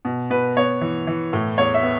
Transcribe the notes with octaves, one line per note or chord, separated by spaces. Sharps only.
B2
B2 B4
B3 C#5
E3
E3
A2
E2 C#5
E5
B3